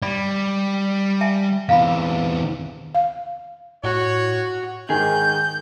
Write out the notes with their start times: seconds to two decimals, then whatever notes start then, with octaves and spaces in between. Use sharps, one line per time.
0.02 G3 D5 B5
1.21 E5 G#5 A5
1.69 E2 C3 F5 A#5 B5
2.94 F5
3.84 A2 F#4 C#5
4.90 G#2 D#3 G#4 G6